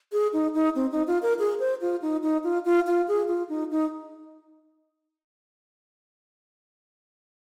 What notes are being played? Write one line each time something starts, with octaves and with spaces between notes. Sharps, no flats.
G#4
D#4
D#4
C4
D#4
F4
A#4
G#4
C5
F4
D#4
D#4
F4
F4
F4
G#4
F4
D#4
D#4